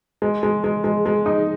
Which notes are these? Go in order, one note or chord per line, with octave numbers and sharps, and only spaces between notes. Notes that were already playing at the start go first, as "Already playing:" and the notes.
G#3
G#3
G#3
G#3
G#3
D#4